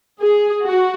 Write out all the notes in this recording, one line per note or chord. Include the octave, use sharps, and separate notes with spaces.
G#4
F#4